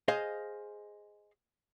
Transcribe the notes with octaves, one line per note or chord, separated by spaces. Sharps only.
G#4 C5 D#5 F5